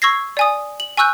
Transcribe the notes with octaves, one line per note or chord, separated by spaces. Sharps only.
C#6 E6 G#6 A#6 C7
D5 G#5 D#6
F#7
G#5 C#6 E6 F#6 G6